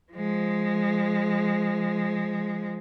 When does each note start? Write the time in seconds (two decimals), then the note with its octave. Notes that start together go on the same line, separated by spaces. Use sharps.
0.12 F3 G#3